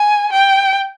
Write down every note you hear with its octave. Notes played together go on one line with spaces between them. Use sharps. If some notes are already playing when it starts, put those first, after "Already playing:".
Already playing: G#5
G5